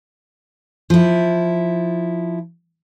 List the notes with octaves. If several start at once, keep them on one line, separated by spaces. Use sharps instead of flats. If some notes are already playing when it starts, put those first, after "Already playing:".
F3 E4